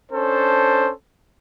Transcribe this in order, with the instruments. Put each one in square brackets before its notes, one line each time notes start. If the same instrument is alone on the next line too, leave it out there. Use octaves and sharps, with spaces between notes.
[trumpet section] C#4 D4 A4 C5